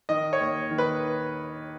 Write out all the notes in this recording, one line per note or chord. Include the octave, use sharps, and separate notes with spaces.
D#3 D#5
C#5
D#2
D#3
B4